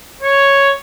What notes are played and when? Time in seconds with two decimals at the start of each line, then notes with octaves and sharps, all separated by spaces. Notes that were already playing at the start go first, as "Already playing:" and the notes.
0.22 C#5